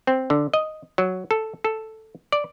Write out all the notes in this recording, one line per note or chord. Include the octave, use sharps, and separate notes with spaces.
C4
D3
D#5
F#3
A4
A4
D5